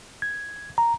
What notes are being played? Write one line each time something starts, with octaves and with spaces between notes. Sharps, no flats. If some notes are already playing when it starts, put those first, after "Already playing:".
G#6
A#5